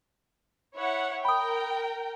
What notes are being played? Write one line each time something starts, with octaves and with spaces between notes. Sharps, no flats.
E4 C#5 F#5
A#4 G5 B5 D#6